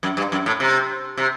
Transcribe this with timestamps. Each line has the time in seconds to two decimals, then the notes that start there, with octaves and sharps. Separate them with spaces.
0.03 F#2
0.17 G2
0.32 F#2
0.46 A2
0.60 C3
1.18 C3